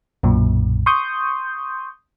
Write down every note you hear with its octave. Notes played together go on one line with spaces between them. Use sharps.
B1 F#2 A#2
C6 C#6 D#6 G6